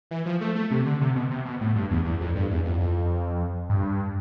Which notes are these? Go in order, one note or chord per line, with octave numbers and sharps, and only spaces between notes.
E3
F3
A3
A3
C3
D3
C3
B2
C3
B2
A2
G2
E2
E2
F2
G2
E2
F2
F2
G2